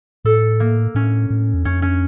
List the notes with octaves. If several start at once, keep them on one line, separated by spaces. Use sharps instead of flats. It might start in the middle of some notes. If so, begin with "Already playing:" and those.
A2 A4
A#3
A2 C#4
A2
E2
F2 C#4
C#4